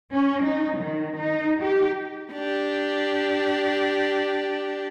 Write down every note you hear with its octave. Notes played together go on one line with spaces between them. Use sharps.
C#4
D#4
D#3
D#4
G4
D4 G4